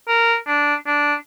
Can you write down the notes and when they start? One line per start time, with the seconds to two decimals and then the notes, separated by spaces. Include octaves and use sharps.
0.08 A#4
0.47 D4
0.86 D4